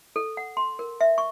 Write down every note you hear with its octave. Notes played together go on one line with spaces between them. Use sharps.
A4
F#5
C6
A#4
E5
C#6